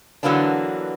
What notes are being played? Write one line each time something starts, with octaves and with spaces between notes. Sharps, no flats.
D3 E3 F#3 A#3 B3 D4